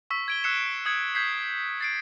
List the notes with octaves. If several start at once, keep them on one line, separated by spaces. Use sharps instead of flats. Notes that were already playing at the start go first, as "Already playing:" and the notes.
C#6 E6 B6
G#6 D7 G7
E6 F#6 C7 C#7 E7
D#6 G#6 C#7
G6 G#6 B6 C7
A6 C7 D7